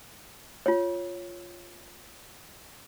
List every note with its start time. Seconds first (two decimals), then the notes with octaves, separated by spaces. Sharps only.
0.66 F4 C#5